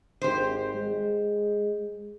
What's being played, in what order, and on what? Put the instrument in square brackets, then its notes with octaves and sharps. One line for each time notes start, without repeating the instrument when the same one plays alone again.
[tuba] G#1 [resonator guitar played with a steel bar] G4 C5
[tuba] G#3